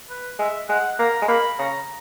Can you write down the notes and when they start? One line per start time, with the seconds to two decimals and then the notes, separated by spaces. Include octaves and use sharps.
0.09 B4
0.39 G#3 E5
0.69 G#3 F#5
0.99 A#3 A#5
1.22 G#3
1.28 A#3 B5
1.58 C#3 A#5